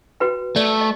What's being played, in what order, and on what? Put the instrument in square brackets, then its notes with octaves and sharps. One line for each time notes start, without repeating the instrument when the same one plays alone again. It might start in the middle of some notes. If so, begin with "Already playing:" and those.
[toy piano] F#4 B4 G5
[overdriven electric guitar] A3 [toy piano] D5
[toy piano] D#5